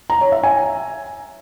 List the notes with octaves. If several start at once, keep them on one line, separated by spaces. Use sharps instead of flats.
A#5
C#5
E5
G#5